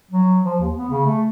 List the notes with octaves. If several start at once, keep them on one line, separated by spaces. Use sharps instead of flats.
F#3
F3
D#2
B3
C#3
A3